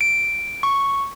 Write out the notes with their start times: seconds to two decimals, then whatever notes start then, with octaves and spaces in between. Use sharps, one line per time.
0.01 D7
0.63 C#6